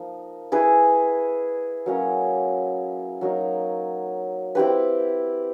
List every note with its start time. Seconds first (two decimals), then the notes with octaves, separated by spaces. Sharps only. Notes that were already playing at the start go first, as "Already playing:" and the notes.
Already playing: F3 A#3 D#4
0.52 E4 G#4 B4
1.86 F#3 A#3 C#4
3.21 F#3 A#3 D#4
4.55 C4 E4 G4 B4